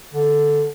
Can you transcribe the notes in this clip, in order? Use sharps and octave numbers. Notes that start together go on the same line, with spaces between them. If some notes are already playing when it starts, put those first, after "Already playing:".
D3